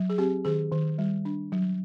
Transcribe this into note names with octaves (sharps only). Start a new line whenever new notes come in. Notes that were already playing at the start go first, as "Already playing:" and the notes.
Already playing: F#3
G#4
C4 G4
D#3 G#4
D#3
G3
D4
F#3